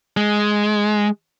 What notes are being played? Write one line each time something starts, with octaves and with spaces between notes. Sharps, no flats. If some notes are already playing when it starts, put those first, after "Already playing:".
G#3